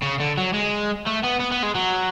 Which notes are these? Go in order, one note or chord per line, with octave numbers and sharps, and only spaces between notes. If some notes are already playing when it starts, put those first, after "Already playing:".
C#3
D3
F#3
G#3
A3
B3
B3
B3
G#3
F#3